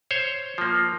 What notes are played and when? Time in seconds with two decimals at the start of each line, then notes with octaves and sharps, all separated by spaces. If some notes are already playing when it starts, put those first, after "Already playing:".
0.11 C5 C#5
0.58 F3 A#3